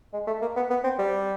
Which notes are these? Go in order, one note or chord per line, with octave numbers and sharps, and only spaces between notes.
G#3
A3
A#3
B3
B3
C4
G3